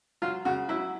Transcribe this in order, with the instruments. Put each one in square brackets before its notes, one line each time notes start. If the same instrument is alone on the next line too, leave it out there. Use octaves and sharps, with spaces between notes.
[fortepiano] F#3 F4
C#3 F#4
F#3 E4